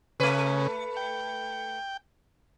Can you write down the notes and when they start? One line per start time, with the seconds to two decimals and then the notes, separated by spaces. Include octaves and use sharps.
0.20 C#3 A3 B4
0.97 G5